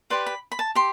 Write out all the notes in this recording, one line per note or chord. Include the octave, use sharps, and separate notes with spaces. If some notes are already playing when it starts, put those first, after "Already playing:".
G4 B4 D5 C6
B5
B5
A5
G4 C6